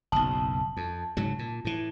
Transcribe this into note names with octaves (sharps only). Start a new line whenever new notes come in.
F#1 B1 A5
F2
G#2 C#3 F#3
A#2
A2 E3